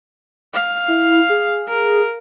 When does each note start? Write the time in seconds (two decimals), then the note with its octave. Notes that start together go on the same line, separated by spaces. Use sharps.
0.54 F5
0.88 E4
1.30 G#4
1.67 A#4